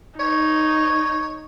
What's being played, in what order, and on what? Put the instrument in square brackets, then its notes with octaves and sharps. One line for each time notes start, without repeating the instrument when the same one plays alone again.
[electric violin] D#4 [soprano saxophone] C#5